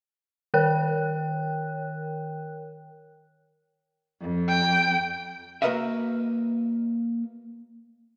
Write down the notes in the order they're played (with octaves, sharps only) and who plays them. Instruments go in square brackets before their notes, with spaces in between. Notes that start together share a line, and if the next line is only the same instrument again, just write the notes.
[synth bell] D#3 A#4 C#5 G5 F#6
[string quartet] F2
[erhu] G5
[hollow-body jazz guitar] A#3 F#4 A#4 B4 D#5 E5